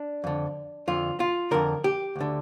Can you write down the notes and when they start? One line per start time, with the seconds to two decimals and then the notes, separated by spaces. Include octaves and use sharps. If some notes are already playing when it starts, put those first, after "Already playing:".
Already playing: D4
0.24 F2 D3
0.88 F2 D3 F4
1.20 F4
1.51 F2 D3 A#4
1.84 G4
2.16 D2
2.21 D3